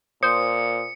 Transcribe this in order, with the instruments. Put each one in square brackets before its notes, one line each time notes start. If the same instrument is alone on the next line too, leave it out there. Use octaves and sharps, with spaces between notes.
[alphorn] A#2 [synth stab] C5 [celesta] D#6 [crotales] C#7